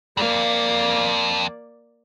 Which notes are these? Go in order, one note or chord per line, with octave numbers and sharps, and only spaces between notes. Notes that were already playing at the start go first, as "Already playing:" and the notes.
F2 A#3 D5 F5